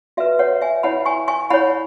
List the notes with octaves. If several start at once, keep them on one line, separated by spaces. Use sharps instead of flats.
F#4 B4 E5
C#5 F#5
E5 G#5
E4 C#5 F#5 B5
G#5 C#6
G#5 C#6
E4 C#5 F#5 B5